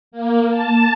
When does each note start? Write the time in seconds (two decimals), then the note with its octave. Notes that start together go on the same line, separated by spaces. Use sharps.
0.12 A#3
0.50 A5